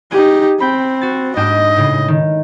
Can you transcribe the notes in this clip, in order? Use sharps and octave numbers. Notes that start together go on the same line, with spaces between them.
D#4 G4 G#4
C4 G5 B5
F#4 A6
G#2 D4 D#5 G5
A2 C#3
D#3